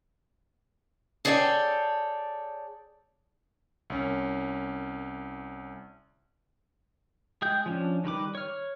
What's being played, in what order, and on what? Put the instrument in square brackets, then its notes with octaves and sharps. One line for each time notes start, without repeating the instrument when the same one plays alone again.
[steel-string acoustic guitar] G#4 A4 C#5 D5 F5 G5
[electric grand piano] C2 C#4
[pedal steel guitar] G#3 G#4 G5 G6
F3 C#4 D4
D#3 G3 B4 D6
C#5 F6